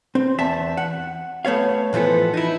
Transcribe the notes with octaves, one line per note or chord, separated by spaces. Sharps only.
C4
E2 E5 A5
F#5
A3 B3 C#5 F5
A2 E3 F3 B3 A4
D#4 E4